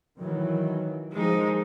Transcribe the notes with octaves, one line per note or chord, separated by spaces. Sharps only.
D#3 E3 F#3
D#3 F3 G#3 D#4